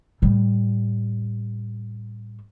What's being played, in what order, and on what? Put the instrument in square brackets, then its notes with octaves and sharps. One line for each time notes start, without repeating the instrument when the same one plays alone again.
[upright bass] A2 G3